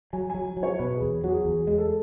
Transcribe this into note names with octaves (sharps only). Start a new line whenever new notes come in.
F#3 G#5
F#3 G#5
F#3
C#5
B2 B4
G#4
E2
F#3 F#4 G#4
E2 G#4
G#3
A4